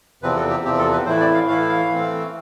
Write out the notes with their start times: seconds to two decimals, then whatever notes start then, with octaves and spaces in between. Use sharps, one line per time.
0.23 E2 C3 F3 C4 B4
0.36 A4
0.50 G4
0.64 E2 C3 F3 C4 G4
0.79 A4
0.92 B4
1.06 A2 E3 A3 E4 C5
1.20 D5
1.34 F5
1.48 A2 E3 A3 E4 F5
1.69 F5
1.90 E3 A3 C4